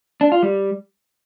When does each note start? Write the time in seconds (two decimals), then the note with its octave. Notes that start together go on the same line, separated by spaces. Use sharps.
0.21 D4
0.32 F4
0.43 G3